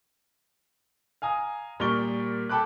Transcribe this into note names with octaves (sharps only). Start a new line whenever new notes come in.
F5 G#5 A#5 D#6
A#2 G3 A#4 D5 C#6 G7
A4 G5 A5 B5 D6 F#6